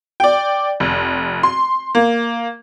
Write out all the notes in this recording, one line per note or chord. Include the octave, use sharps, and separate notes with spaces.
D5 G5
F1
C6
A#3